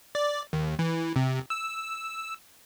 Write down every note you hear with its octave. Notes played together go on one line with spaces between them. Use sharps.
D5
D#2
E3
C3
E6